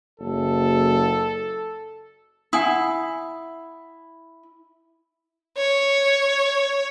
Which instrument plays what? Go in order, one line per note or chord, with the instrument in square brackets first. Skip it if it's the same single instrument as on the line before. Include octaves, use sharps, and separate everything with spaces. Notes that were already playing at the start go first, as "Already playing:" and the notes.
[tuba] F#1 [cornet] A4
[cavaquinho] E4 [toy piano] F#5 G#5 D#6
[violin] C#5